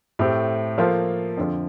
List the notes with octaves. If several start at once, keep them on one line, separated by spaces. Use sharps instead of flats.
A2 A3 C4 G4
F3 A#3 F4 A4 C5
F2 D3 F3